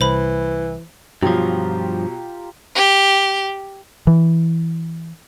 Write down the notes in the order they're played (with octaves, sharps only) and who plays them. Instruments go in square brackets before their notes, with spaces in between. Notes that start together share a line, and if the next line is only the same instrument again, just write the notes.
[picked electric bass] C2 [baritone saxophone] E3 [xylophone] C5 B5
[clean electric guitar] G2 F3 [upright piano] B2 F#3 [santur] F4 G4 A#5
[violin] G4
[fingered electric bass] E3